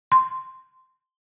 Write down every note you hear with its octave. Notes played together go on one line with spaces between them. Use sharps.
C6